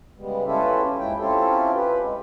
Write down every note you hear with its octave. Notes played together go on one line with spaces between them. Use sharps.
C#3 G3 G#3 B3
C#4 E4 F4 G4 A4 B4
D#2 G#2 G#3 E4 G5
C4 C#4 E4 F4 G4 A4
G4 B4
G#3